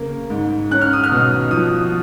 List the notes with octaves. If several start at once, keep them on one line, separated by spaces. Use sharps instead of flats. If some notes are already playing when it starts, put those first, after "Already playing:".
Already playing: C#3 A#3
G#2
C#4 F#6
F6
D#6
F6
B2
F3 D#6